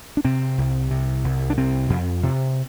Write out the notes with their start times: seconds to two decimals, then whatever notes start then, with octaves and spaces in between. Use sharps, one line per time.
0.17 D4
0.25 C3 C4
0.58 C2
0.91 C3
1.24 C2
1.50 D4
1.57 C3 C4
1.90 F2
2.23 C3